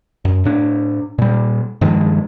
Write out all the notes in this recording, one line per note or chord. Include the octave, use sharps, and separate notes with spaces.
F#2
A2 D4
A#2 G3
G2 D#3 F3 G#3